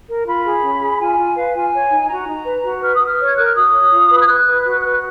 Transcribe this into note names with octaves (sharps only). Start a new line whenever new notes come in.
A#4
F4 B5
G#4
C#4
G#4
F4 G#5
F4
B4 F5
F4 G#5
C#5
D#4
F#4 A#5
D#4
B4
F#4
B4 F6
D#6
B4 F6
C#5
G#6
A#4 F#6
F6
F#4 D#6
C#5
F4
B4
G#6
B4 F#6
B4
F#4
B4